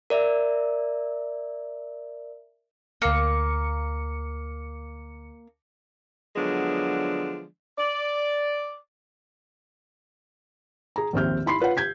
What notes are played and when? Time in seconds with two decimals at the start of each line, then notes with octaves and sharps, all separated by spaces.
0.10 A#4 D5 E5
3.02 D2 A#3 C#7
6.36 D3 F3 F#3 G#3 B3 D4
7.78 D5
10.96 G#4 A#5
11.13 A#1 D#2 C4 E5 F6 G6
11.46 E4 B5 C6 C7
11.60 F4 B4 C#5 F#5
11.77 G6 G#6 B6